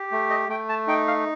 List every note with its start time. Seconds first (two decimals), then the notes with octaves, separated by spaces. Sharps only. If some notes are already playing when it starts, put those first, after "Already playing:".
Already playing: G4
0.12 A3
0.30 D#5
0.49 A3 G5
0.69 A5
0.87 D#4 G5
1.08 F5